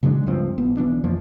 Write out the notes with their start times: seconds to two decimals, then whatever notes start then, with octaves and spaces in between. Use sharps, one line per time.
0.03 C#3 F#3 G#3 D4
0.26 C#2 G2 F3 C4
0.58 A1 B3
0.77 B1 E3 B3 D4
1.04 F2 E3 F3 A#3